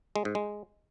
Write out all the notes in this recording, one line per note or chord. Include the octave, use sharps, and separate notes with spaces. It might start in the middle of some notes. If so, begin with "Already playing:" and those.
G#3
G#2
G#3